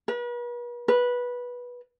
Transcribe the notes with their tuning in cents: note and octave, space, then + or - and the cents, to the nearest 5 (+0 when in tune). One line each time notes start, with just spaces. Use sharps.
B4 -40
B4 -15